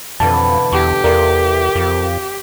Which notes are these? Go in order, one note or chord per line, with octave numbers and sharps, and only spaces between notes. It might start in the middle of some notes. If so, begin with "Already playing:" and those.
F2 B2 D3 E3 A5
E2 G4
E2 C3 F4 A4 A#4 D5
F2